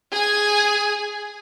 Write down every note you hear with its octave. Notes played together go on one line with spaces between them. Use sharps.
G#4 G#5